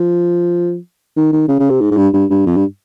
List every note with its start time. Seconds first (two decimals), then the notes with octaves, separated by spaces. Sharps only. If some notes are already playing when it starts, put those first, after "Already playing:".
Already playing: F3
1.16 D#3
1.32 D#3
1.48 C#3
1.59 C#3
1.70 C3
1.81 G#2
1.91 G#2
1.97 G2
2.14 G2
2.30 G2
2.46 F2
2.57 G2